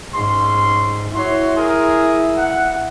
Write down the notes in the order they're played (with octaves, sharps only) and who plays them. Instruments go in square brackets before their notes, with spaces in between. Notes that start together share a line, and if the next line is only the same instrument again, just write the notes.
[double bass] G#2 [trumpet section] C#4 C6
[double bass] E4 [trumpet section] F#4 C#5 C6
[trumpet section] G#4 A#4
F#5